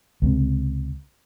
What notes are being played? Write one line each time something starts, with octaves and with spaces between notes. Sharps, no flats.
C#2 C3